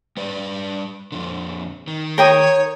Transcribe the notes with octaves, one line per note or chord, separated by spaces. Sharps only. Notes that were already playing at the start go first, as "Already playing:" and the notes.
G3 B4 D5
F2 D3
D#3
A#4 C#5 G5 D#6